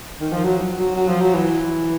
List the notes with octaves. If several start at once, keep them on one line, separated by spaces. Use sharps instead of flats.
D#3
F3
F#3
F#3
F#3
F3
F#3
E3